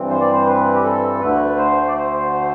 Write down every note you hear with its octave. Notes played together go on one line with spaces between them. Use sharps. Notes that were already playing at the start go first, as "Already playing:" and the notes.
Already playing: G2 E3 G3 C4
C5
D5
C5
B4
G4
A4
D2 D3 A3 B4
C5
D5
C5